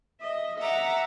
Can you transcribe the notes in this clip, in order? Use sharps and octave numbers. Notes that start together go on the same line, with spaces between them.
D#5 E5
E5 F#5 A#5 D6